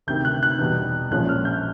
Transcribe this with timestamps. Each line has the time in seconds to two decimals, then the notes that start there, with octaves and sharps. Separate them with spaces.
0.07 D2 C3 D#3 G6
0.25 F#6
0.43 F#6
0.59 E2 B2 G3
1.11 A#1 A#2 F3 G#3 C#4 F#6
1.29 F6
1.45 G6